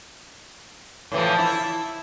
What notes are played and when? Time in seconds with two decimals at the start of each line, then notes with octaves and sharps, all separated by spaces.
1.12 A2 E3 F3
1.39 E4